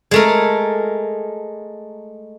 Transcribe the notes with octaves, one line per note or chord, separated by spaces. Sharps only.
G#3 A3 A#4